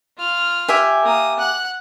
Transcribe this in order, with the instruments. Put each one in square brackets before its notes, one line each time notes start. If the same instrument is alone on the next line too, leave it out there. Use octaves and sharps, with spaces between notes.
[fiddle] F4 F6
[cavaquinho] G4 E5 G#5
[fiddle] A#3 D#6
F#5 F#6